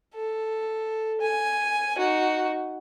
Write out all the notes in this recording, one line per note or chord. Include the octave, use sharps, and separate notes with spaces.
A4
G#5
D#4 F#4